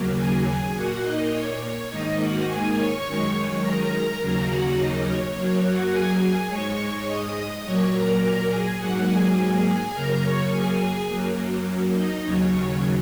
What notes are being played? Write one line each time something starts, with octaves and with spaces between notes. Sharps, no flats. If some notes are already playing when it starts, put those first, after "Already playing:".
Already playing: D#2 C#3 F#3 A#3
G#4 G#5
G#4 G#5
A#2 A#3 F#4 F#5
D#4 D#5
C#5
C#5
G#2 D#3 A#3 D#4 D#5
F#4 F#5
G#4 G#5
C#5 C#6
F#2 D#3 G#3
A#4 A#5
D#2 C#3 F#3 A#3
F#4 F#5
D#4 D#5
C#5
F#2 F#3 A#3
F#4 F#5
G#4 G#5
G#4 G#5
G#2 G#3 C#5 C#6
D#5 D#6
A#2 F#3 A#3 C#5 C#6
A#4 A#5
A#4 A#5
G#4 G#5
G#2 F#3 A#3 F#4 F#5
G#4 G#5
G#4 G#5
F#2 C#3 A#3 A#4 A#5
C#5 C#6
G#4 G#5
F#2 F#3 A#3
D#4 D#5
D#2 C#3 F#3 C#5
C#5